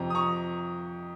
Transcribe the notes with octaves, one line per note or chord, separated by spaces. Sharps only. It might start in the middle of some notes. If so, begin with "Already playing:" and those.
Already playing: F2 C3 F3 A#5
D#6
A#5 C#6